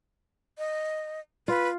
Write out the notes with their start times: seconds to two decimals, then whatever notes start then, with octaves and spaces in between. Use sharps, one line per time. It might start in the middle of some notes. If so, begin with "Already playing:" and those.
0.58 D#5
1.48 F4 B4